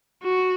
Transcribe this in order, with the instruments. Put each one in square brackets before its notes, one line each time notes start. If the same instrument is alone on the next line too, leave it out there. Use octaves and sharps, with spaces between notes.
[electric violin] F#4